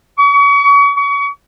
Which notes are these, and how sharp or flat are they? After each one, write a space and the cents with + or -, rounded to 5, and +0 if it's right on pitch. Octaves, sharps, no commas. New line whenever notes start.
C#6 +35
C#6 +35